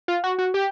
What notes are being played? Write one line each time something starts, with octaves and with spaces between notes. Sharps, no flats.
F4
F#4
F#4
G4